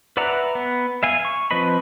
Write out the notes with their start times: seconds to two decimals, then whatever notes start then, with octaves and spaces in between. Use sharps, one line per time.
0.17 B4 D5 E5 F#5 A#5
0.55 B3
1.03 E5 F5 G#5
1.25 C#6
1.51 F3 C4 B4 D#5 B5